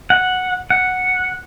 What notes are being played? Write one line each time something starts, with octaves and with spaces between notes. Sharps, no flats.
F#5
F#5